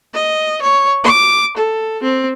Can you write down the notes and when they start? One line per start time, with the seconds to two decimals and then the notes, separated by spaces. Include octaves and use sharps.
0.14 D#5
0.62 C#5
1.04 D6
1.57 A4
2.03 C4